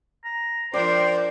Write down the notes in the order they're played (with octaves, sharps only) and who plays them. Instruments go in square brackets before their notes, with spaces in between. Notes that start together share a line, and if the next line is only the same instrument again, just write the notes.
[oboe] A#5
[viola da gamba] F3 D4 A#4 [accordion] C5 G5 [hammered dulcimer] D5 [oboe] C6